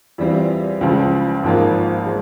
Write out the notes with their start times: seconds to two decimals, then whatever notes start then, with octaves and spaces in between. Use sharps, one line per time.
0.18 E2 E3 G3 C4 F4
0.81 C#2 C#3 F3
1.44 G#1 G#2 F3 A#3 F4
2.06 G#3